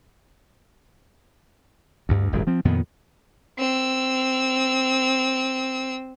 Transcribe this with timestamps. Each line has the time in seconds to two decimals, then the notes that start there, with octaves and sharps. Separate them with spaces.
2.09 D2 G2
2.32 D#1 G#1 F#2 G#3
2.47 F3 C4
2.65 F2 A#2 D#3 B3
3.59 C4 E6